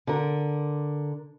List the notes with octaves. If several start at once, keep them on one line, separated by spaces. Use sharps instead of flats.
D3 A#4